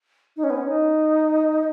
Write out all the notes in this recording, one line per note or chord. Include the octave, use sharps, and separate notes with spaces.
D#4
C#4
B3
C#4
D#4